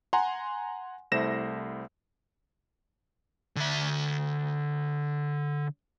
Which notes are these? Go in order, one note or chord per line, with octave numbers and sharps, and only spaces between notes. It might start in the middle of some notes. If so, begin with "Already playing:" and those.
F#5 G#5 A#5 C6
C2 A3 E4 C5 A#6 E7
D3 E5